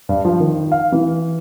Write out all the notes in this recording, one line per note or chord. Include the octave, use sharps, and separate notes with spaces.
G2
F3
D#3
F5
E3